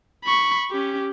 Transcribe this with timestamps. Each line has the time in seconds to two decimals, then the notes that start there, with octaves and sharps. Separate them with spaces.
0.24 B5 C#6
0.71 C#4 G4